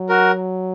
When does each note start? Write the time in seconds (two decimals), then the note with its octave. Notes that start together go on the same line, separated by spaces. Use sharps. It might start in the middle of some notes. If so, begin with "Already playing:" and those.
Already playing: F#3
0.09 F#4 A#4